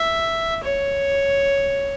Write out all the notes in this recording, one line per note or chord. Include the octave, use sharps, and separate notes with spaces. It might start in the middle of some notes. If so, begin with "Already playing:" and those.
Already playing: E5
C#5